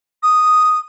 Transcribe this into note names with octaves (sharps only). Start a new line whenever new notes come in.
D#6